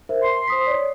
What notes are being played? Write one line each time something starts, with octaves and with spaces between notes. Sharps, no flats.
A#4 C5 E5
C6 C7
C5 D#6 B6
C#5 D5